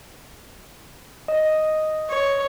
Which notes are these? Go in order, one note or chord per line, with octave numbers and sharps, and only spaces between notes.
D#5
C#5